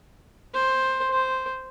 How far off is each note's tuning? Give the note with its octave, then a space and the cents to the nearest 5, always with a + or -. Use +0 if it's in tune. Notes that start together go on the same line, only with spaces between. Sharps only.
C5 +5
C5 -5